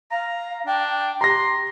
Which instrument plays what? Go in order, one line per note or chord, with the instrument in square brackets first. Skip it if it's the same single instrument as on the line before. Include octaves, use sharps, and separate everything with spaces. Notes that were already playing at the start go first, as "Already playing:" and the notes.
[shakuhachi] F5 [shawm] A#5
[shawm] D4 [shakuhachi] G5
[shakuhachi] G4 [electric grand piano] A#5 A#6 [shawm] C6